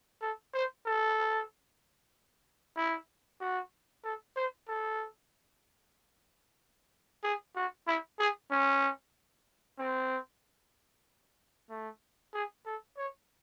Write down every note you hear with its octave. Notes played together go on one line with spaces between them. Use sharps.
A4
C5
A4
E4
F#4
A4
C5
A4
G#4
F#4
E4
G#4
C#4
C4
A3
G#4
A4
C#5